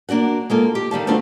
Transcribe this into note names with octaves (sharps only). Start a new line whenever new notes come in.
A#3 D4 F#4 F#5
G#3 A#3 F4 A4
G4
D#3 G3 F5 A5
A3 B3 C4 D4 F4 F#4